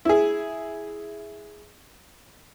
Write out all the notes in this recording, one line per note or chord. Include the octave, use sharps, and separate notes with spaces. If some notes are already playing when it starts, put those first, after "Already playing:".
E4 G#4